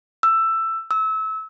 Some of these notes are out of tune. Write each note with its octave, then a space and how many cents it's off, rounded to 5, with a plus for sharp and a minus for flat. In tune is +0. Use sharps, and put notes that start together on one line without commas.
E6 +15
E6 -25